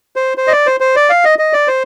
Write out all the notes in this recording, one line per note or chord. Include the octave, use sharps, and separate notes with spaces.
C5
C5
D#5
D5
C5
C5
D5
F5
D#5
D#5
D5
C5